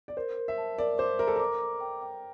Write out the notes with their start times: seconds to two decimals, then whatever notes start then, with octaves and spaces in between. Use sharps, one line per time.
0.08 D5
0.17 A#4 C5
0.38 A#4
0.48 E5
0.58 A5
0.78 A#4 D5
0.98 C5 D6
1.19 A#4 E5
1.27 A4
1.36 A#4 D6
1.60 D6
1.81 G5
2.02 G5